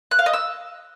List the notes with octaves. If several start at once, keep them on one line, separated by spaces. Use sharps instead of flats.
F#6
F5
D#5
E6